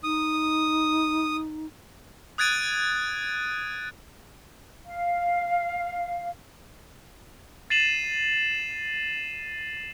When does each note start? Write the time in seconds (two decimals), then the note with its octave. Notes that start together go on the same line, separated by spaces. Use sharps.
0.03 D#4 D#6
2.38 D#6 F#6 G#6 A6 D7 D#7
4.86 F5
7.70 A6 C7 D#7 E7 F#7